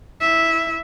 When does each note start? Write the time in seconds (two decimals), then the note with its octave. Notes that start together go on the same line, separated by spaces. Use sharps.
0.21 E4 E5